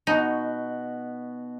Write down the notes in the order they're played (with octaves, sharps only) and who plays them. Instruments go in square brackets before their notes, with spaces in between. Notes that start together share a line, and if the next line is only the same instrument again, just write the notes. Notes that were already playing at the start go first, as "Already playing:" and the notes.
[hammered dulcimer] B2 F#4 [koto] D#4